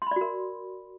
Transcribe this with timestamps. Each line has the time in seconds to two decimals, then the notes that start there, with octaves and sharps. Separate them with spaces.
0.02 C6
0.07 B5
0.11 D5
0.16 F#4
0.21 A#4